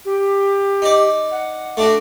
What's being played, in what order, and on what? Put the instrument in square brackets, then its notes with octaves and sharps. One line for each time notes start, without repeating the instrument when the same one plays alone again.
[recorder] G4
[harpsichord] D#4 D5
[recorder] F#5
[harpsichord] A3 D4 F#4